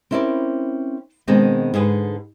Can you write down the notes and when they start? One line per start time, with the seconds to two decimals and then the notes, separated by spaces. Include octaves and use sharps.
0.11 C4 C#4 E4 A#4 C5 D5
1.27 B2 D#3 G#3 B3 C4 D4
1.74 G#2 D3 G#4 B4